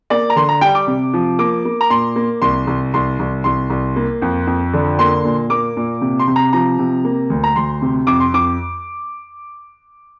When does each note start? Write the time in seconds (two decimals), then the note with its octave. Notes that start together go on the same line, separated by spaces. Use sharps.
0.10 A#3 D5
0.30 A#5
0.36 D3 C6
0.49 A#5
0.61 G3 G5
0.75 D6
0.87 C3
1.14 F3
1.39 A#3 D6
1.65 A#3
1.81 A#5
1.90 A#2 C6
2.16 A#3
2.42 C2 C6
2.67 C2
2.94 C2 C6
3.19 C2
3.44 C2 C6
3.70 C2
3.96 A#3
4.22 F2
4.47 F2
4.73 D3
4.99 A#3 C6
5.25 A#2
5.50 A#3 D6
5.77 A#2
6.01 C3
6.19 C6
6.27 C3
6.36 A#5
6.53 F3 A#5
6.79 C3
7.05 A#3
7.30 D2
7.44 A#5
7.56 D2 C6
7.82 C3
8.07 F2 D6
8.20 C6
8.34 F2 D6